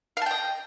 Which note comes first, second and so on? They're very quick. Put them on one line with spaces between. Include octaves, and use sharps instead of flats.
F5 A5 G5 D#5